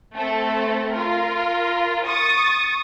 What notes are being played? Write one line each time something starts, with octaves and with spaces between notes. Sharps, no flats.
A3 C4 A4
F4 A#4
C#6 D#6 A6